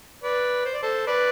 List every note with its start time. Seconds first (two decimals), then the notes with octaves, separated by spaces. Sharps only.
0.23 B4 D5
0.65 C5
0.74 D5
0.82 A4 C5
1.07 B4 D5